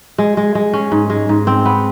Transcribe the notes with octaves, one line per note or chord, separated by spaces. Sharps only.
G#3
G#3
G#3
C#4
G#2
G#3
G#2
C4
B3